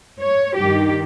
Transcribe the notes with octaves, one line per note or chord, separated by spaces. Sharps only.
C#5
G2 D#3 G4